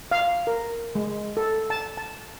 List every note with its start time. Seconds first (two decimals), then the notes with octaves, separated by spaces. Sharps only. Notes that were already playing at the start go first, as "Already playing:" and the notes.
0.11 F5
0.47 A#4
0.95 G#3
1.37 A4
1.70 A5
1.98 A5